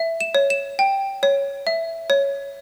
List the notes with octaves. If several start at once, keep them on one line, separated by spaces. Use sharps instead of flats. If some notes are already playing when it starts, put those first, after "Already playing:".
Already playing: E5
E7
C#5
E7
G5
C#5
E5
C#5